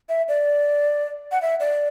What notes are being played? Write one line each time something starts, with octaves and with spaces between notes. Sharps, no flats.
E5
D5
F#5
E5
D5